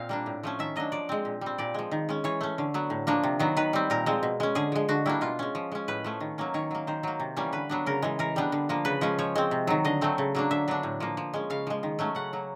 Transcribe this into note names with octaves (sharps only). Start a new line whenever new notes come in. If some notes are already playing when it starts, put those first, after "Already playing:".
Already playing: A#2 C4 F5
G3 A#3 D4
A2
F3 A3 C#4
D#3 E5
F#3 A#3 D4 D#5
F3 D5
G#3 C4
A#2
G3 C4
A#2 D5
F3 G#3
D#3
G#3 C#4
E3 C#5
A3 C#4
D3
F#3 B3
A2
F3 A#3 D4
C3
D#3 F#3 B3
D#3 B4
G3 C4
A#2 A#4
F3 G#3 C4
B2
G#3 C#4
D3 G#4
F3 G#3
D3 F#4
G3 A#3 D4 E4
B2 F4
G#3 C#4
F3
G#3 C#4
A2 B4
F3 A3 C#4
D#3
F#3 A#3 C#4
D#3 C#5
F#3 A#3
D#3 C5
F#3 A#3
C3
E3 G3 A#3 C#4
D3 B4
F#3 B3 D4
C#3 A#4
E3 G#3
E3 A#4
G3 B3 D4
D3
F3 A#3
C#3 B4
F3 G#3 C#4
F3 C#5
G#3 C4
C3
D#3 F#3
D3 D#5
F#3 A3 C4
C#3
F#3 A#3 D4
D3 E5
F#3 B3 D4
A2
F3 A#3
F3
G#3 C#4
C#3 F5
F3 G#3
D#3
F#3 A3 C#4
C#3 F#5
F#3 A#3